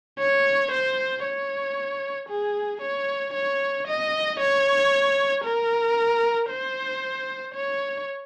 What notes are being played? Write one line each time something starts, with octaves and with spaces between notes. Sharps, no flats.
C#5
C5
C#5
G#4
C#5
C#5
D#5
C#5
A#4
C5
C#5